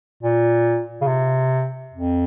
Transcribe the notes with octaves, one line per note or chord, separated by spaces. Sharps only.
A#2
C#3
C3
F2